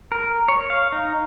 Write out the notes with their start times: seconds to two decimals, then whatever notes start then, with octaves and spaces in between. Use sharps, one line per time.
0.12 A#4
0.48 C#5
0.70 F5
0.92 D#4